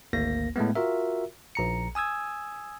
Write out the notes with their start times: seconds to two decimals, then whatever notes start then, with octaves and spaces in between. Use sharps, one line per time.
0.13 G#1 D2 A#3 A#6
0.56 A2 G#3 A3 B3
0.75 F4 F#4 A#4 E5
1.55 A#1 A#5 C#7
1.95 G#5 D#6 E6 G#6